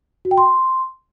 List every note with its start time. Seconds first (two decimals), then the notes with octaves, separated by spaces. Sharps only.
0.25 F#4
0.31 G5
0.38 C6